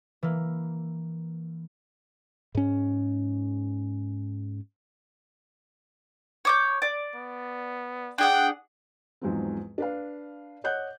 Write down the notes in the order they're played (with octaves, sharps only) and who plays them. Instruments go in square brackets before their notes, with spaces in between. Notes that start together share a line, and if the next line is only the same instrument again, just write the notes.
[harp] E3 A#3
[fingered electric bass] G#2 C#4
[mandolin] C#5 D6 G6
D5
[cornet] B3
[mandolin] D4 G#4 F#5 [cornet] G5
[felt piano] E2 G#2 F3 F#3 G#3 C4
D4 B4 F5
C#5 D#5 F#5 F#6 G6